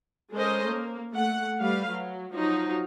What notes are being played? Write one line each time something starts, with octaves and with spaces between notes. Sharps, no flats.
G#3 C#4 A4 A#4 C5 D#5
A#3
A3 F#5
G3 A3 B4 F5
F#3
F3 F#3 D#4